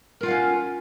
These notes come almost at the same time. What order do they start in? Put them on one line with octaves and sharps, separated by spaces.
A#4 F4 F#5 F5 C#4